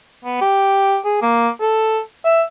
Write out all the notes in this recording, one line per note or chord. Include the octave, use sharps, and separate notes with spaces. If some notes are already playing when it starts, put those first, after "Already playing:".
B3
G4
G#4
A#3
A4
E5